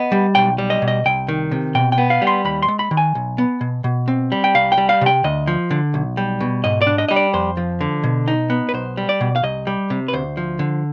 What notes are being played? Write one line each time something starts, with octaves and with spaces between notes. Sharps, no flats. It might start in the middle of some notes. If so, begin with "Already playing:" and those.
Already playing: B3 D#5
G3
B1 G5
G3
D#5
B2
D#5
C2 G5
D#3
C3
B2 G5
G5
B3
F5
G3
C6
D#2 B5
C6
G#3
B5
D#3
G#5
B1
B3
B2
B2
C4
G3
G5
C2 F5
G5
G3
F5
C3 G5
D2 D#5
F3
D3
B1
G3
B2
G#2 D#5
D5
D4
D#5
G3 D#5
D5
F2 C5
F3
D3
B2
D#4
B3
B4
B1 C5
G3
D5
B2
F5
C2 D#5
G3
C3
B4
D2 C5
F3
D3